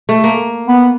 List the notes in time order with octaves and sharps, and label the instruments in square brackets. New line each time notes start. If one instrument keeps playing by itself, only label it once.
[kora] A3
A#3
[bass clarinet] B3